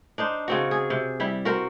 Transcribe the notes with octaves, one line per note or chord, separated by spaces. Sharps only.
D4 D#4 C5
C#3 C4 F#4
G#4
C3
G3 E4
F#4 A#4 C5